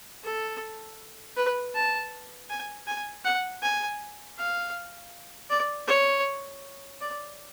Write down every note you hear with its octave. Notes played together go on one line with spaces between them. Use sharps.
A4
B4
A5
G#5
G#5
F#5
G#5
F5
D5
C#5
D5